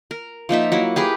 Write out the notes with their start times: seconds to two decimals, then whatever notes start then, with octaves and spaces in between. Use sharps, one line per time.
0.11 A#4
0.49 F3 A#3 D#4 E5
0.72 F#3 A#3 E4
0.96 G4 G#4 A#4 B4